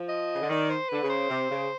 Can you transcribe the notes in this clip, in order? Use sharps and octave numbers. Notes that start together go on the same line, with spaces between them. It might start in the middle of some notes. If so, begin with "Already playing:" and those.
Already playing: F3
D#5
C#3
D3
D#3 D5
C5
D3 B4
C#3
C5
C3
C#3